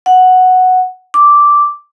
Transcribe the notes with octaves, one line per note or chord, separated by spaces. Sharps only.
F#5
D6